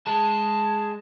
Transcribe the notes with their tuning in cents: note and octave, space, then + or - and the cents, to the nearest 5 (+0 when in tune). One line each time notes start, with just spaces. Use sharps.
G#3 +0 A5 +0